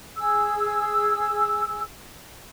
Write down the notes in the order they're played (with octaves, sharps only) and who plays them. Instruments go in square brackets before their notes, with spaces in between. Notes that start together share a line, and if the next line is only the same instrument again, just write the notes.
[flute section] G#4 E6